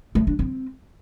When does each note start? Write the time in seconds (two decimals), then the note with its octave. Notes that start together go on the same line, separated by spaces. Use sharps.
0.15 A3
0.27 D4
0.39 C4